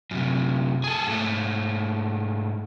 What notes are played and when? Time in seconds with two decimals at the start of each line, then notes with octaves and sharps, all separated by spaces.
0.11 F#2 C3
0.84 G#4 A4
1.07 G#2 A3